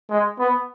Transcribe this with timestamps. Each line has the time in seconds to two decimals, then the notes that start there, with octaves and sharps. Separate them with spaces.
0.10 G#3
0.39 B3